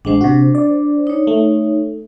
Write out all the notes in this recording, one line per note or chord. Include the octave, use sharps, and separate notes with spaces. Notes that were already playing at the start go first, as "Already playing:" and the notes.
A1 G#3 D4 C5
C3 F#4
D5
D#4 C#5
A3